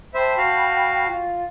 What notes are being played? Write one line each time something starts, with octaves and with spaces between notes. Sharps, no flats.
C5 E5 G5 A5 B5
F#4 F5
F4